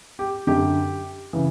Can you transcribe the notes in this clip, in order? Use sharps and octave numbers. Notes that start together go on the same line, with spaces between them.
G4
F#2 D3 G4
C#3 E3